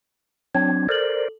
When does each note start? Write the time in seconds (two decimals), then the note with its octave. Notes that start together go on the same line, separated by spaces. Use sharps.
0.55 F#3 C4 D4 G#6
0.89 A4 A#4 C5 D5 F#7